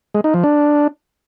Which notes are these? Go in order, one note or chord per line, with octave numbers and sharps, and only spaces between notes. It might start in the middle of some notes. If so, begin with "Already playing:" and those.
G#3
D#4
F3
D4